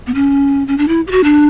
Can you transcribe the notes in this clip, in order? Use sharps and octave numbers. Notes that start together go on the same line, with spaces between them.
B3
C#4
C#4
D4
E4
G4
F#4
D4